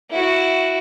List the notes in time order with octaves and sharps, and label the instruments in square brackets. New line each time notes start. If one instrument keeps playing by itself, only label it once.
[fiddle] E4 F#4